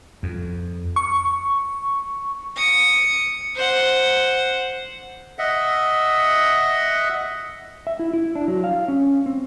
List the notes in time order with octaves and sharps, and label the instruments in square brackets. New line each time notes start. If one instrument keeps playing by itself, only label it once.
[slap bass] F2
[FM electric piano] C#6
[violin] D#6 C#7
C5 F#5
[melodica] D#5 E5 F#5
[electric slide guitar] E5
E4
E4
D4
F#3
F5
C#4
C4